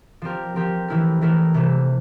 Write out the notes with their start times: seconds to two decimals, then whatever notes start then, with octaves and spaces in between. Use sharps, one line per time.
0.22 F3 C4 G4 A#4
0.56 F3 C4 G4 A#4
0.88 E3 A3 E4 A#4
1.21 E3 A3 E4 A#4
1.54 C3 E3 A3